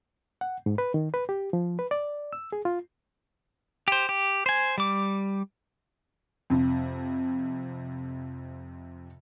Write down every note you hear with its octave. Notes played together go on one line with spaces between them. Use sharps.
F#5
G#2
B4
D#3
B4
G4
F3
B4
D5
E6
G#4
F4
G4 C5
G4
C5 G#5
G3 D6
F2 C3